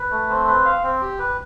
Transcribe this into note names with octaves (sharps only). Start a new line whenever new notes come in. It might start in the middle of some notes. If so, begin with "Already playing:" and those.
Already playing: B4
A3
C4
B4
F5
C4
G4
B4